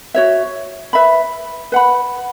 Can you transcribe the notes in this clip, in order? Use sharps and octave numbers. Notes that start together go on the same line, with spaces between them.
F#4 C#5 E5
B4 E5 B5
B4 F#5 B5